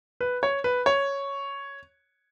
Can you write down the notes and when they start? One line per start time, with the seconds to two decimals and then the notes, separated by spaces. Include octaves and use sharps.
0.21 B4
0.43 C#5
0.64 B4
0.86 C#5